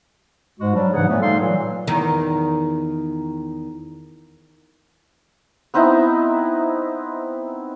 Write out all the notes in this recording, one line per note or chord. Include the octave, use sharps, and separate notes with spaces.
G#2 G#3 F#4
F#3 G3 D4
G#2 C#3 E3 D4 G#4 F#5
A#2 F#3 A3 B3
G3 A3 D#4 A4 F5 C6
A#2 E3 F#3
E2 D#3
B3 C4 D#4 E4